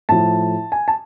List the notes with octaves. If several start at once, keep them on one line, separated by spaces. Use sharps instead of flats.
A2 F3 A5
G#5
A5